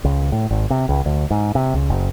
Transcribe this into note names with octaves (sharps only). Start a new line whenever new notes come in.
C#2
A2
G#1
C3
C#2
D2
G#2
C3
C#2
F#1